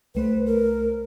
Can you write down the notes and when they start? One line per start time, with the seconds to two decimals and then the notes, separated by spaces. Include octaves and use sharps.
0.15 C2 A3 B4 C5
0.46 A#4